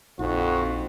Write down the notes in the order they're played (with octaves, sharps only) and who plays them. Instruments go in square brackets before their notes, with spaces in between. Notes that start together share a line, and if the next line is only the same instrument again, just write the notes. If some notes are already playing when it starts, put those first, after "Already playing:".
[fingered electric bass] A#1 [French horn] F2 [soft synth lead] D#4 [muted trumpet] F#4